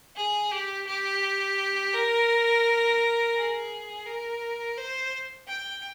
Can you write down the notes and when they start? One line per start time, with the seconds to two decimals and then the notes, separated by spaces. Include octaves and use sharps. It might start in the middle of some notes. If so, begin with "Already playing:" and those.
0.16 G#4
0.51 G4
0.87 G4
1.94 A#4
3.36 G#4
4.06 A#4
4.78 C5
5.47 G5